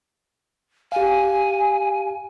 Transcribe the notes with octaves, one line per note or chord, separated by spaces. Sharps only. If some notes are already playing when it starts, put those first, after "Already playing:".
G4 F5 G#5